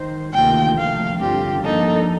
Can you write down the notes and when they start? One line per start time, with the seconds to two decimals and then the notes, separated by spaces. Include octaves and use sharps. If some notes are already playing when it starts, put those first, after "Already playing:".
Already playing: D#3 C5
0.33 D2 C3 D#3 A#3 F4 G5
0.77 C3 F3 A3 F5
1.20 G2 D3 G3 C4 F4 G4
1.63 G2 F3 A#3 D4 D#4 A4